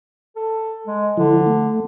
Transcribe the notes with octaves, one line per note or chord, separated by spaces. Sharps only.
A4
G#3
D3 F3 E4
A3